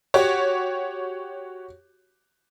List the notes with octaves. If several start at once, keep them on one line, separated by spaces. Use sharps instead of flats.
F#4 G4 C#5